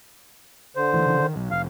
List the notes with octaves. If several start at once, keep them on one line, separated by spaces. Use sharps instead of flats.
D3 C5
D2 E3
C#3 E3
D#3
B1
F1 F5